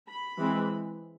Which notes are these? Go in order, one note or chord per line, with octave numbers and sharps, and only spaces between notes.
B5
E3 G#3 C4